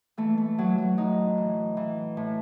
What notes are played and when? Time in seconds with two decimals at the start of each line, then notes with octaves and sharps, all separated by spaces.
0.17 E3 A3
0.38 A3
0.58 A2 F#3
0.78 F#3
0.97 A2 D#4
1.37 E3
1.77 E3
2.17 A2